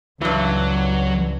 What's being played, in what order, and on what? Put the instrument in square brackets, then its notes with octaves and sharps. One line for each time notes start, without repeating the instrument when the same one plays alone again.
[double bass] C#2 [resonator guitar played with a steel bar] G2 E3 [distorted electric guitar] F#3